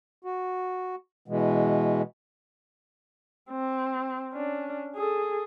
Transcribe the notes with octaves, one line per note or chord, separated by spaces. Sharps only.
F#4
B2 E3 G#3
C4
C#4 D4
G#4 A4